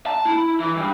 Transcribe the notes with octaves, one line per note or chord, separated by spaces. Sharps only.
A5
E4
E3
G2